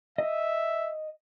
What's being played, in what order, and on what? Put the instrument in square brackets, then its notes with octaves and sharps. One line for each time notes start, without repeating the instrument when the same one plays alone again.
[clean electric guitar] D#5 [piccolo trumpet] E5